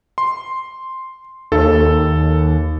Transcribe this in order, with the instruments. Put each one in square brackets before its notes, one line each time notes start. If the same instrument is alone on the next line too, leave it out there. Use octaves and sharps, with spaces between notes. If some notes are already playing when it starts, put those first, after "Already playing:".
[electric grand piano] C6
[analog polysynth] D#2 [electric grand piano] A4